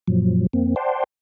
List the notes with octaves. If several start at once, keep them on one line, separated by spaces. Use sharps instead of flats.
F#2 A#2 F3 F#3
F2 A#3 C4
C5 D5 F#5 G5 A5 C6